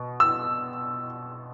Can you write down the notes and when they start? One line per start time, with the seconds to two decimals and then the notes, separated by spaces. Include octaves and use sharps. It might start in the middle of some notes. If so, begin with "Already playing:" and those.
Already playing: B2
0.20 E6